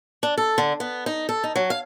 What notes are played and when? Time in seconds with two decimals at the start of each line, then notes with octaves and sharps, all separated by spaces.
0.23 D4
0.38 A4
0.58 D3
0.80 B3
1.06 D#4
1.29 A4
1.44 D#4
1.56 F#3
1.70 F5